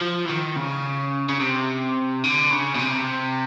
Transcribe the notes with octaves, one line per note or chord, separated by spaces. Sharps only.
F3
E3
D#3
C#3
C#3
C3
D3
C#3
B2
C3